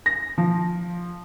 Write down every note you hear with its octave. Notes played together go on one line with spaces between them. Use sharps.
A#6
F3